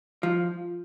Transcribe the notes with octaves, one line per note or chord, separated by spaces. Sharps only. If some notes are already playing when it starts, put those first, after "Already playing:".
F3